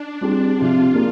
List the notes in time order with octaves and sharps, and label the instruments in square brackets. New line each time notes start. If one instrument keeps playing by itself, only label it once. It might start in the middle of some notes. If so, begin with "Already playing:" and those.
Already playing: [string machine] D4
[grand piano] G3 C4 F4 G#4
[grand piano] C3 F3 C4 G4 [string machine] F4
[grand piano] A#3 D4 G#4